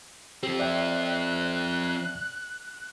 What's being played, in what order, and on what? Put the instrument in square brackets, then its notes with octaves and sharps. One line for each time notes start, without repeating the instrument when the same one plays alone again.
[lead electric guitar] F3 C4 [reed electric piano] G4
[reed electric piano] D5 E5 G5 [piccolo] F#6